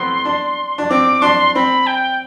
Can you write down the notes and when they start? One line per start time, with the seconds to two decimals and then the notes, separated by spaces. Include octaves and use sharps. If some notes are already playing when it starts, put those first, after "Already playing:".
Already playing: A3 B3 C4 C6
0.25 D4
0.78 D4
0.90 C4 D6
1.22 D4 C6
1.55 C4 B5
1.87 G5